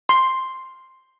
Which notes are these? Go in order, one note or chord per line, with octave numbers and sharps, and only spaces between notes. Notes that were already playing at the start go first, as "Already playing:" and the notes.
C6